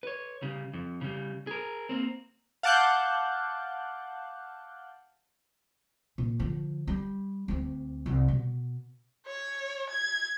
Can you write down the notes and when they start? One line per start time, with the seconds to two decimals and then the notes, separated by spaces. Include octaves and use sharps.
0.03 B4 C#5
0.42 C#3 G3
0.74 F2
1.01 C#3 G3
1.47 G#4 A#4
1.89 A#3 C4
2.63 F5 F#5 A5 D6 F#6 G6
6.18 A#2
6.40 D3 F3
6.88 G3
7.48 D2 C4
8.06 C2
8.28 B2
9.27 C#5
9.90 G#6